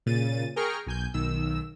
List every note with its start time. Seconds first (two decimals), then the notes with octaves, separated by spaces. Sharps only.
0.06 A#2 C#3 A6 D#7
0.56 G#4 A#4 G5 A#5 C#6 F6
0.86 B1 G#5 G6
1.14 B1 D#3 E6